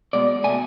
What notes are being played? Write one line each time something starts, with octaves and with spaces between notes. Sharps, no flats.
B2 G#3 D5
B2 A3 G#5